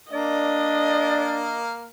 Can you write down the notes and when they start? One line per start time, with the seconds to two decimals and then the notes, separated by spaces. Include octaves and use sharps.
0.12 A#3 D4 D5 D#5